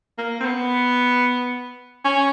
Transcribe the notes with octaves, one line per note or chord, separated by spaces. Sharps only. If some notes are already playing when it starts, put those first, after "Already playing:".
A#3
C4
B3
C#4